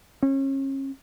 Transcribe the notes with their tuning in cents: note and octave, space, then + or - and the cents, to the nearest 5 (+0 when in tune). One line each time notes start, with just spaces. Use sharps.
C#4 -35